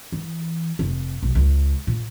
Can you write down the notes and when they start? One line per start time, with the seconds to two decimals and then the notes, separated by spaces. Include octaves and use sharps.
0.12 E3
0.79 F1
1.23 B1
1.35 C#2
1.87 A#2